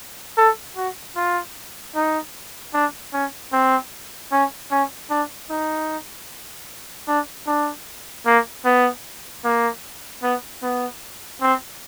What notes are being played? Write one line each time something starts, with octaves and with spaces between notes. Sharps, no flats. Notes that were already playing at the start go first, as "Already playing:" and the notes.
A4
F#4
F4
D#4
D4
C#4
C4
C#4
C#4
D4
D#4
D4
D4
A#3
B3
A#3
B3
B3
C4